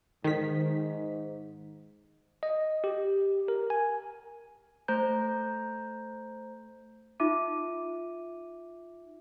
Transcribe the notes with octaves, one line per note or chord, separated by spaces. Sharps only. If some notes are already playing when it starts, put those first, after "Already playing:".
G#2 D#3 B6
D#5
G4
A#4
G#5
A3 C5 A#5 G6
D#4 F4 E5 D6 D#7